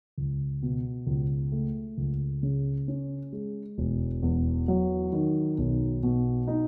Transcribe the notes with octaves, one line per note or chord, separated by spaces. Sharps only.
C#2
B2
C#2
A3
C#2
C#3
C#4
G#3
E1
E2
F#3
D#3
B1
B2
D#4